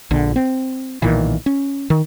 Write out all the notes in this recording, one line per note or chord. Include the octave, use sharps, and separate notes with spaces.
A#1 D3
C4
B1 A#2 D#3 E3
C#4
D#3